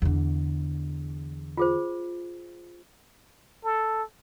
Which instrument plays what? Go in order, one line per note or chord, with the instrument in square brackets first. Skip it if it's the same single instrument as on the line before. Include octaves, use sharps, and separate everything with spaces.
[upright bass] E2 D3
[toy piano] F4 G#4 C5
[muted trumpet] A4